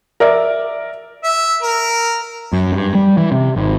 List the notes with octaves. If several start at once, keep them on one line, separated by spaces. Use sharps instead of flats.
A#4 D5 E5
E5
A#4
F#2
G2
G3
E3
C3
G#1